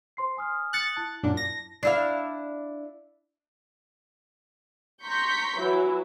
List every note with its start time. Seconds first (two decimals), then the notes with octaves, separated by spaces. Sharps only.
0.17 C5 C6 C7
0.37 G#5 D#6 F6
0.73 D#6 F#6 A6 C#7
0.96 E4 A5
1.23 F#2 A#2 D4
1.37 A#6
1.83 D4 E4 F5
5.04 A#5 C6 C#6 G6 B6
5.59 E3 F#3 E4